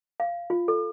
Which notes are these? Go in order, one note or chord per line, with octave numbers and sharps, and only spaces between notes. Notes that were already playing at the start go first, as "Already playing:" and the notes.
F5
F4
A4